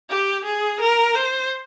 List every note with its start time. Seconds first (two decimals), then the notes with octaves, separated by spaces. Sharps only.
0.10 G4
0.44 G#4
0.80 A#4
1.15 C5